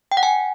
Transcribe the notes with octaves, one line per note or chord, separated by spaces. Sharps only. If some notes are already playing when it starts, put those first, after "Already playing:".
G5
F#5
G#5